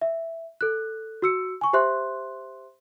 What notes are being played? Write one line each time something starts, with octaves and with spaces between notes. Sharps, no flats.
E5
A4 F#6
F#4 E6 C#7
G#5 C#6
G4 C5 E5 C6 F#6